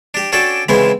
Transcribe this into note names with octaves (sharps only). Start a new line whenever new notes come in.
D4 G4
C#4 D4 F#4 A4 D5 G5
C#3 E3 G#3 B3 C4 E4